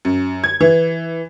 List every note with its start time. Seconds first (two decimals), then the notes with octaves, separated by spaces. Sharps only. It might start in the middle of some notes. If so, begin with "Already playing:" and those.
0.05 F#2
0.44 G#6
0.60 E3